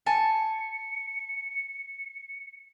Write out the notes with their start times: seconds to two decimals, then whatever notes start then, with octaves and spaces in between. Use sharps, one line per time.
0.06 G#5 A5 C#7